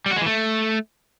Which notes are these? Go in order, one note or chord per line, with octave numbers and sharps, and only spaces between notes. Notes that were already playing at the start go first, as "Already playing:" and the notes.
G3
F#4
G#3
E3
A3